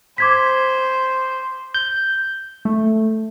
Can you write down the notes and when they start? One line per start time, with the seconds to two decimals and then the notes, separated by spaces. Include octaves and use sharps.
0.18 C5 D6 G#6 B6
1.74 G6
2.65 A3